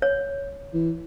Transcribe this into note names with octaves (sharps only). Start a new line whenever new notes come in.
C#5
E3